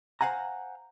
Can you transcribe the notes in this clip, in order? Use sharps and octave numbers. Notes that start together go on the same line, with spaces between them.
C5 F5 F#5 G#5 A#5